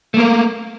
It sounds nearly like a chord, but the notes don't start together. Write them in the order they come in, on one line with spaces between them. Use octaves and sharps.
A3 A#3 A#4